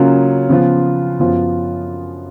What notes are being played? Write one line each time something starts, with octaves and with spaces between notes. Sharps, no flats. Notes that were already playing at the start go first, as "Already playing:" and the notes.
Already playing: C#3 F#3 A#3 C#4 F4
C#3 F3 B3 F4
F#2 F3 B3 F4